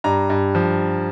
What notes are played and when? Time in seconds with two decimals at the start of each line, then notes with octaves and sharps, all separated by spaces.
0.04 G2 A#5
0.30 G2
0.55 F3